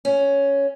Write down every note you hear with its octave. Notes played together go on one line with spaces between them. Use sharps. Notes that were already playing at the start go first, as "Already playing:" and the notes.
C#4